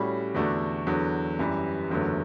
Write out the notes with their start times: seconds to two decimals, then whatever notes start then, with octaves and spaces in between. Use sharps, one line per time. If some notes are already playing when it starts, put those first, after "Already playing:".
Already playing: A2 G3 C#4 F#4
0.34 E2 D3 A3 D4 F#4
0.86 E2 D3 F#3
1.39 F#2 E3 G3
1.90 F#1 E2 D3 F#3 A3